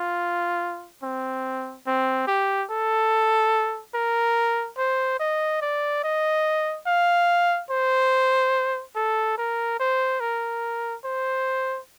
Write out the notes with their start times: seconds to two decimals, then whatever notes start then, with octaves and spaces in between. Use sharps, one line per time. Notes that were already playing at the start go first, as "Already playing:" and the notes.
Already playing: F4
1.03 C4
1.87 C4
2.27 G4
2.70 A4
3.95 A#4
4.78 C5
5.20 D#5
5.62 D5
6.04 D#5
6.87 F5
7.71 C5
8.96 A4
9.38 A#4
9.79 C5
10.20 A#4
11.05 C5